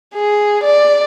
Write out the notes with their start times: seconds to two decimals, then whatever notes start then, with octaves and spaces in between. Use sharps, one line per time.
0.15 G#4
0.64 D5